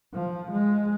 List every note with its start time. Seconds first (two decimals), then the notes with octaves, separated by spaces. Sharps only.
0.13 F3
0.51 G#3